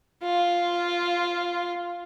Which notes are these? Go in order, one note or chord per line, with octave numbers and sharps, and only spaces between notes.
F4